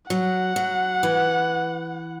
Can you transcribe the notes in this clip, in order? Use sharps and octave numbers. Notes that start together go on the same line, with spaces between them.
F#3 F#5
F#3
E3